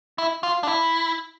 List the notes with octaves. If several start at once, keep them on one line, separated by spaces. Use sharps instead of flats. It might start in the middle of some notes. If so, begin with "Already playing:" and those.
E4
F4
D4
E4